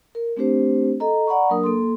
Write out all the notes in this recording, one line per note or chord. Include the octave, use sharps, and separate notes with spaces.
A#4
A3 C4 D4 G4 C5
A4 D#5 A#5
D5 F#5 A#5 B5 C#6
F#3 A#3 D4 A#4 D#6
A#3 A4 C6